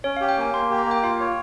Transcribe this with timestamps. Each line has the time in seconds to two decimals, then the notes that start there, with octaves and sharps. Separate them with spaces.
0.04 C#4 C#5
0.17 F5
0.21 G4
0.29 G5
0.37 A#3 G#5
0.54 A#3 C6
0.71 G4
0.78 A#5
0.86 A#3 G5
1.03 F4 F5
1.20 C#5